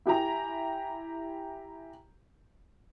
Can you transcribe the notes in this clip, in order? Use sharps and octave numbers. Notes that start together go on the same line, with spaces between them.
E4 G4 G#5 A#5